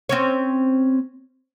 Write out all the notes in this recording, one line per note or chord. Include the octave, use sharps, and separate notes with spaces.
C4 C#4 C#5